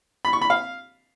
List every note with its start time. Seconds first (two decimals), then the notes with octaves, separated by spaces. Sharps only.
0.25 B5
0.33 C#6
0.42 B5
0.50 F5